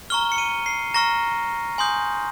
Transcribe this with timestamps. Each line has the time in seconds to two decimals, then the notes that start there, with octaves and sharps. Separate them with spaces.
0.10 A#5 C#6 F6 G7
0.32 C#7
0.38 D#7
0.66 C7
0.94 A#5 C#6 F6 A#6
1.78 G#5 C6 D#6 G6